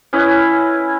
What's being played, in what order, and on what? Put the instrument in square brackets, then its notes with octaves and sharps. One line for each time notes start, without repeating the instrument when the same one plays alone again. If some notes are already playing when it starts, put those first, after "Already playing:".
[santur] C#4 E4 B4 D#5